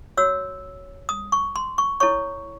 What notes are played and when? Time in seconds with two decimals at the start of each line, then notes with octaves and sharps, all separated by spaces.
0.17 F#4 C#5 E6
1.09 D#6
1.32 C#6
1.56 C6
1.78 C#6
2.00 E4 A4 C#5 C#6